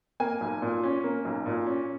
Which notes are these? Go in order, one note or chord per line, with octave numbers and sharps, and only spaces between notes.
A#3 G#5
B1
A#2
C#4
A#3
B1
A#2
C#4